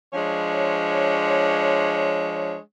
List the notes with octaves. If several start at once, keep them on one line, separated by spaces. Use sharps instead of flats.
F3 G#3 D4 C#5